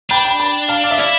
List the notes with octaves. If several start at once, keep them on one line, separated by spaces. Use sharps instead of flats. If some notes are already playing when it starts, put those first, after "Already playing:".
D4 G5 B5
G5 B5
G5 B5
F5 A5
D5 F5
E5
E4 D5 F5